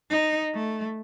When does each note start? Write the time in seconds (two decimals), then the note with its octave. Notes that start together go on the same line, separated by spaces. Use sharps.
0.10 D#4
0.55 A3